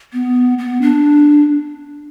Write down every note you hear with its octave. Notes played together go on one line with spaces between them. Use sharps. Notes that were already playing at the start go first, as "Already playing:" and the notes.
B3
B3
D4